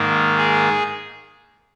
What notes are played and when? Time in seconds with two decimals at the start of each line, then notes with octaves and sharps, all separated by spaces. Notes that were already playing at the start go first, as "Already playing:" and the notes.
Already playing: G#2 D#3 A#3
0.38 G#4